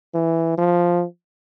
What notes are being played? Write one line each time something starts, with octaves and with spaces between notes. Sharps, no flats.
E3
F3